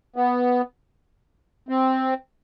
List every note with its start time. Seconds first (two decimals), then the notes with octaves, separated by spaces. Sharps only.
0.16 B3
1.69 C4